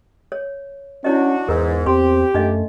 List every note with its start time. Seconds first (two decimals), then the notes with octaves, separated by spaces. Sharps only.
0.32 C#5
1.04 C#4 D4 E4 F#4 C#5 D#5
1.48 E2 G#2 E3 A#4
1.86 E2 C4 G4 C6
2.34 F#2 A3 D4 D#5 F5